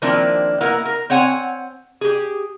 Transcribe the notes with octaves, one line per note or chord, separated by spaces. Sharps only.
D#3 F3 A#3 C4 D4 E4
A#3 B3 E4 A#4 F#5
A#4
C4 C#5 F#5 G#5
G4 G#4